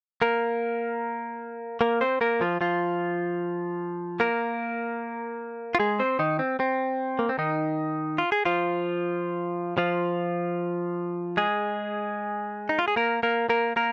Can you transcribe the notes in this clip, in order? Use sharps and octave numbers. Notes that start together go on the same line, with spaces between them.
A#3 A#4
A#3 A#4
C4 C5
A#3 A#4
F3 F4
F3 F4
A#3 A#4
F4
G#3 G#4
C4 C5
D#3 D#4
C4
C4
A#3
C4
D#3 D#4
F4
G#4
F3 F4
F3 F4
G#3 G#4
D#4
F4
G#4
A#3 A#4
A#3 A#4
A#3 A#4
A#3 A#4